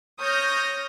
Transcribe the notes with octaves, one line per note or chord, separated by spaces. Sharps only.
C#5 D#6 F6 G6 A#6